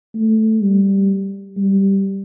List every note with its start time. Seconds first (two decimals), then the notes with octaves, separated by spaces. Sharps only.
0.15 A3
0.62 G3
1.57 G3